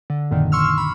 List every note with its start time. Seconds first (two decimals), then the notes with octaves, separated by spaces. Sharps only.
0.10 D3
0.31 G#1 F#2 A#2 D3 D#3
0.52 C6 C#6 E6 F6
0.78 B5